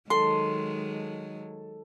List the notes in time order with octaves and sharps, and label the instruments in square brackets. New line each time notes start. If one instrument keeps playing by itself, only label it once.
[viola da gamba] D#3 F#3 G#3 [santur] A4 [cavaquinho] C6